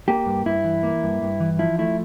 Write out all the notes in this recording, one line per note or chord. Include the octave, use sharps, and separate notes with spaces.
A#3 G4
G2
G2 E4
E3
A#3
G2
G2
E3
F3 E4
A3 E4